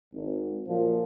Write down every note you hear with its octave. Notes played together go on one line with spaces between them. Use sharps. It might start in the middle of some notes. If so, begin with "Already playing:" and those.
G#1
F#2 A#2 F3